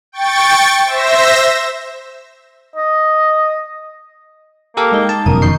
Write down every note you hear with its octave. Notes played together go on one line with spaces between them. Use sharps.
G5 C#6 A6
C5 E5 E6 A#6
D#5
A#3 G4 A4 A#4
G#3 D#4 G5
A5
F1 F#2 B2 A#4 D#6
D#3 C#6 G6 C7